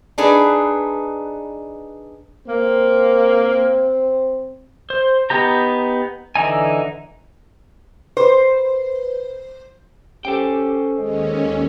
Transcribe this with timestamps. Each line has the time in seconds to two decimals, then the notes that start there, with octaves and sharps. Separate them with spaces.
0.18 D4 D#4 G#4 B4
2.47 A#3 C4
4.90 C5
5.30 B3 D#4 G4 A#5
6.36 D3 E3 D#4 G#5
8.17 B4 C5
10.25 C#4 G4 A4 C5 G5
10.98 D#2 G#3 C#4 D#5